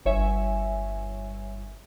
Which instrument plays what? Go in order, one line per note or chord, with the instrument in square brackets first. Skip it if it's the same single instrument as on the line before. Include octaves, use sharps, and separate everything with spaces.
[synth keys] G1 C#5 E5 G#5